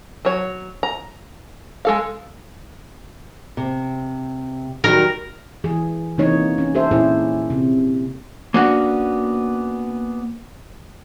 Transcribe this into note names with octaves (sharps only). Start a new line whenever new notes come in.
F#3 C#5
A#5
G#3 A4 F5
C3
D#3 F#3 G3 A#4
E3 G#4
C3 E3 A#3 D#4 C#5
C#4
G4 A4 C5 E5
A#2 C#4 E4 G#4 C5
C3
A#3 B3 C#4 D4 F#4